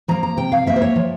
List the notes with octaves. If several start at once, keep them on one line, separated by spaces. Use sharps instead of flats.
F3 A#3 A#5
A#5
C3 G5
F5
F3 A#3 E5
C5
C#5
F3